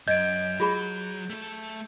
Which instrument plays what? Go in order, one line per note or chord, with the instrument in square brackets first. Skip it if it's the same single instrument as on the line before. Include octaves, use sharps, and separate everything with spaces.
[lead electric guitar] F#2 [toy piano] D#5 [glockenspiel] G6 G#6 D7
[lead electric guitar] F#3 [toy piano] F4 G#4 B5
[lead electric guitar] A3 A4